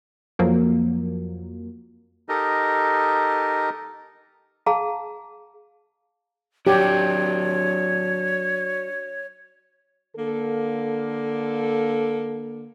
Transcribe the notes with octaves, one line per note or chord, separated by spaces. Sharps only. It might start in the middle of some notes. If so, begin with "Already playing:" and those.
F2 F3 F#3 A#3
D#4 G4 A4 A#4 D#5
G#4 F5 A5 A#5
F#3 D4 G4 C#5
D3 A#3 A4